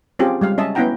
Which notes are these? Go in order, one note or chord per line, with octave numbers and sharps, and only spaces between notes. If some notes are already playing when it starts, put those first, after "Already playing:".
C4 C#4 F4 G4 G#4
G3 G#3 F5
C#4 D#5 E5 A5
B3 C#4 E4 F#5 G5 A#5